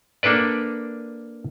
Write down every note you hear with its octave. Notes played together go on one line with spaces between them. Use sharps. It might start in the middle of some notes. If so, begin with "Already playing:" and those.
A#3 D4 A4 B4 D5